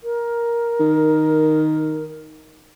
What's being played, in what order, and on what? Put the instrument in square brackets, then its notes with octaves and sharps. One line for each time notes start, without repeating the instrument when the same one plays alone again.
[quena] A#4
[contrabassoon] D#3